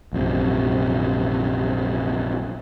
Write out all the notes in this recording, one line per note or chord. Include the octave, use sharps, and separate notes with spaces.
A#1 F#2 C3